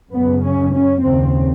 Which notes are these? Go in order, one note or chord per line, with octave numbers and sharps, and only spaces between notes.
F#2 C#3 B3
C#4
C#4
D#2 C#3 C4